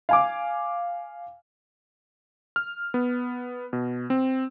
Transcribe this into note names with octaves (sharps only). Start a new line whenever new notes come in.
F5 G#5 D6
F6
B3
B2
C4